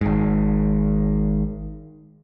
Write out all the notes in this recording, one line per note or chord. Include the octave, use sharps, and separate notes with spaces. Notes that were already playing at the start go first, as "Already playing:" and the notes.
G#1 G#2